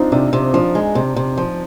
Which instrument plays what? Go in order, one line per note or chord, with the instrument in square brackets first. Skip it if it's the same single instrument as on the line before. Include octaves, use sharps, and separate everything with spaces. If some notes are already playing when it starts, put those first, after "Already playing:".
Already playing: [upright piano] C4 D4 D#4 F4
[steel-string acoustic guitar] C3 [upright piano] D4
[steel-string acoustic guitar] C3 [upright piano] C4
[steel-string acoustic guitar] F3 [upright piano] D4
[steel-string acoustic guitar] G#3
C3
C3
F3